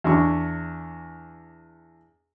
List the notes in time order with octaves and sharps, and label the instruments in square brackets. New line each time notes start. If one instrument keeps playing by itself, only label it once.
[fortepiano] E2 D4 C#6